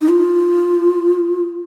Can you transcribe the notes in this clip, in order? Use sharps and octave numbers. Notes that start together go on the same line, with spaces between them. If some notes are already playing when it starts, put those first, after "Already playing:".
D#4
F4